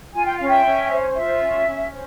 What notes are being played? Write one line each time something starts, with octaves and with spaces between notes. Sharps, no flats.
F4 G#5
G5
C#4 F5
E5 G5
C#4
C5
F4 E5
C#4
C#4
C5